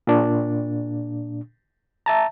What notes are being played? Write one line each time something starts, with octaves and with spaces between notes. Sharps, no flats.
A#2 D4
E5 A5 A#5